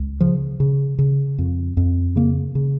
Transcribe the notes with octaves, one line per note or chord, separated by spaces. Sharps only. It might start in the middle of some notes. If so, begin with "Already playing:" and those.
Already playing: C#2
C#3 F3
C#3
C#3
F2
F2
C#3 A#3
C#3